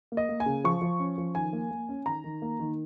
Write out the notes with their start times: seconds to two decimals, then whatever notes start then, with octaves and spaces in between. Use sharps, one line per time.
0.12 A#3
0.17 D#5
0.29 A#3
0.40 G#5
0.46 C#3
0.64 F3 C#6
0.82 F3
0.99 C#4
1.18 F3
1.35 D#3 G#5
1.53 A#3
1.71 A#3
1.89 C#4
2.06 D#3 A#5
2.24 D#3
2.42 A#3
2.60 D#3